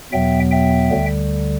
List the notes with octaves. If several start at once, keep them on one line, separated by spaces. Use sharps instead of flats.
E2 B2 F#3 B3 E5 G5
E5 G5
D2 D3 G3